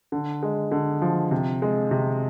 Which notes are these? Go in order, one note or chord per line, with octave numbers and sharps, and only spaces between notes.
D3
G#3
D3
F3
C3
G#3
C3